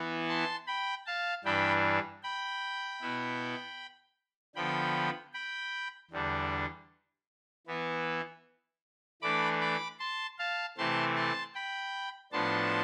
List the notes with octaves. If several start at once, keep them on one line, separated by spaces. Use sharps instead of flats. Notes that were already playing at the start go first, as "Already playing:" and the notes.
Already playing: E3 B3 E4
A5 C6
G5 B5
F5 A5
G2 E3 G3 D4 G5 B5
G5 B5
B2 B3 E4
D3 F3 B3 G5 B5
G5 B5
E2 D3 G3 D4
E3 B3 E4
E3 A3 D4 B5 D6
B5 D6
A5 C6
F5 A5
C3 E3 A3 C4 A5 C6
A5 C6
G5 B5
A2 F3 B3 D4 A5 C6